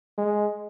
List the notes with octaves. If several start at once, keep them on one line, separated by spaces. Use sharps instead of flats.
G#3